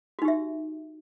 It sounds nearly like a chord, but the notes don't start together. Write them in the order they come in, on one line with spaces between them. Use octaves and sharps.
F#4 D#4 G4 E5